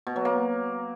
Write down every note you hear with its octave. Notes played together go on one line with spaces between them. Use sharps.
B2
F#3
A#3